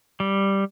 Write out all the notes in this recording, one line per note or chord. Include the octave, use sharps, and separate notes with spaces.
G3